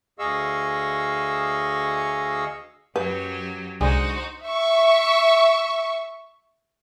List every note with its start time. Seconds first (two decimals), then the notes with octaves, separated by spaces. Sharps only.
0.19 D2 G#4 D#5 F5 C#6 E6
2.96 F#2 F#3 G4 B4
3.81 C2 D3 G#3 D#4 F#4 C5 G#5
4.46 E5 C#6